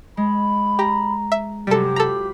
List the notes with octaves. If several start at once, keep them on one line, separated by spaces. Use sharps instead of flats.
G#3 B5
G4 A#5
E5
F#2 C3 G3 G4 A4
F4 A4 A#5 B5